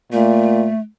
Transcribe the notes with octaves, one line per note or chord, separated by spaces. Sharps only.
A#2 A3